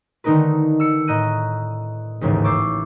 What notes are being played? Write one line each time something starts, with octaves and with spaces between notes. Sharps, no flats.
D3 D#3 A3 D#4 A#4 B4
E6 C#7
A2 D#5 A#5 F#6 G6 D#7
A1 D#2 G#2 C#3 E3 A3
C#6 D6 E6 G6 A6 C7